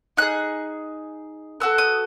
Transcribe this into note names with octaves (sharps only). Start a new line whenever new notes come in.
D#4 G#4 F#6
B3 F#4 A4 E6
D#6